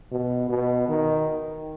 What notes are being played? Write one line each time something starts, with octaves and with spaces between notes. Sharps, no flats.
B2
B2
D#3